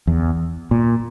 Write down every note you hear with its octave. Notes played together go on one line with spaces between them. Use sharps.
E2
A#2